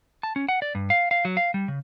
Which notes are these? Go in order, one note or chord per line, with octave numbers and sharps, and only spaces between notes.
A5
C#4
F#5
D5
G2
F5
F5
F#3
F5
G3
C#3